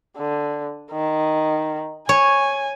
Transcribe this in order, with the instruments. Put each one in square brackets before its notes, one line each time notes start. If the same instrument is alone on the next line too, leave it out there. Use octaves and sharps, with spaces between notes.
[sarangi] D3
D#3
[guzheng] C#5 [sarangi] G#5